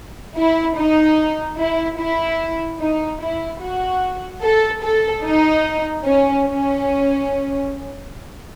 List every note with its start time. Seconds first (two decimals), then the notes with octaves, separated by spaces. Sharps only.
0.36 E4
0.76 D#4
1.58 E4
1.98 E4
2.80 D#4
3.20 E4
3.61 F#4
4.42 A4
4.82 A4
5.24 D#4
6.05 C#4
6.46 C#4